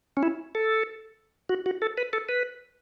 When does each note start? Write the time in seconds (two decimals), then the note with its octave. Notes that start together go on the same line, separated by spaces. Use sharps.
0.17 C#4
0.23 E4
0.55 A4
1.49 F#4
1.66 F#4
1.82 A4
1.98 B4
2.13 A4
2.29 B4